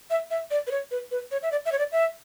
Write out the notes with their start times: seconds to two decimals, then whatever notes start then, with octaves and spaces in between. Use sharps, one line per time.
0.10 E5
0.31 E5
0.51 D5
0.67 B4
0.71 C#5
0.91 B4
1.11 B4
1.31 C#5
1.43 E5
1.52 D5
1.65 E5
1.72 C#5
1.79 D5
1.92 E5